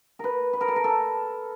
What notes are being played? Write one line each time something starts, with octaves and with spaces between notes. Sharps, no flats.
A#4 B4
B4
A#4
A4
A#4
A4